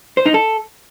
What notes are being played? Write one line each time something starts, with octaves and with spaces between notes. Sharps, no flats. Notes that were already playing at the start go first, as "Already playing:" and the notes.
C5
D#4
A4